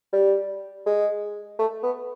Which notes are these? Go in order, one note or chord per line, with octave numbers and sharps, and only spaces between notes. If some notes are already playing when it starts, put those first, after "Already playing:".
G3
G#3
A3
B3